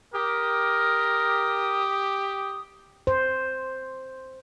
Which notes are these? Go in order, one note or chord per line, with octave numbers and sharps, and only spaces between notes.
G4 A#4 D#6
C5